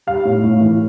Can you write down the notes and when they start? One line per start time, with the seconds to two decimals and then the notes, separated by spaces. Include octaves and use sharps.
0.07 G3 F5
0.25 A2
0.44 A2
0.61 E3